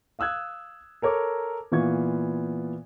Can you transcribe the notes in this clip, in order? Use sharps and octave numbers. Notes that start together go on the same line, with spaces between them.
F5 D#6 E6 F#6 G#6
A4 A#4 C#5 D6
A#2 E3 B3 F4 C#6 G#6